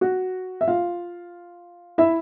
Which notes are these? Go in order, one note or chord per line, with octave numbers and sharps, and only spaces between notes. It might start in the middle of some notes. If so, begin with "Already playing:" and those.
F#4 F#5
E5
F4 F5
E4 E5